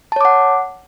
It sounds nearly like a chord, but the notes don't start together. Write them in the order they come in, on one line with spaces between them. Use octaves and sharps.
A5 C#5 D6 F#5